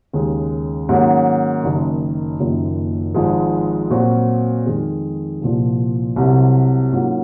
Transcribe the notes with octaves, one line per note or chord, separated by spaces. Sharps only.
D#2 C#3 G#3
G#2 D#3 F#3 A#3 C#4
F#1 F#2 D#3
F#1 F#2 D#3 A#3 F4
G#1 G#2 F3 G#3
A#2 F#3 C4 F#4
F2 D#3 G#3
C2 A#2 F3
C2 C3 F#3
G#2 F#3 A#3 C#4 F4